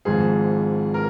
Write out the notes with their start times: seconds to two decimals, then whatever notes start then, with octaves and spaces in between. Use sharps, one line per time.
0.05 G#1 G#2 F3 G#4
0.94 A#4